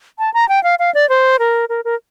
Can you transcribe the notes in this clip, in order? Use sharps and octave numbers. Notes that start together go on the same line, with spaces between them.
A5
A#5
G5
F5
F5
D5
C5
A#4
A#4
A#4